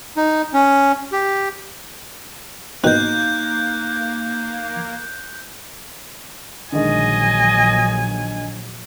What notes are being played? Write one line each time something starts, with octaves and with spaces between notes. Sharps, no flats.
D#4
C#4
G4
G#2 B2 D#3 A#3 D#4 F#6 G6
A#1 D3 D#3 F#3 G#3 D#5 G#5